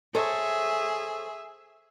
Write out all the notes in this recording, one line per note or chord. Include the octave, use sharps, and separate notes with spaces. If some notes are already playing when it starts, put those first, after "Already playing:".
G#4 A4 C5 C#5 E5